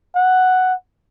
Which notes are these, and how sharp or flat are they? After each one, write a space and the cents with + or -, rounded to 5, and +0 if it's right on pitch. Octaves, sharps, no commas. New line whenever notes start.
F#5 +5